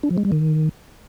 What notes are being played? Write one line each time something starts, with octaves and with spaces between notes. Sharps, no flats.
D4
F3
G#3
G3
D#3